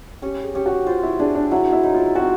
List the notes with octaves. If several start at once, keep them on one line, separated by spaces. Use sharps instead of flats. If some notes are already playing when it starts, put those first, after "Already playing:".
C#4 G4
G#4
C#4 G4
F#4
F4 C5
E4
D4 G#4
D4
F#3 E4
E4
D#4
F4
C4 F#4